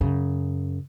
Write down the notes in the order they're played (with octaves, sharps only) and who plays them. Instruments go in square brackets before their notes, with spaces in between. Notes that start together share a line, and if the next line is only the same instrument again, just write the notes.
[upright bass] F#2 C#3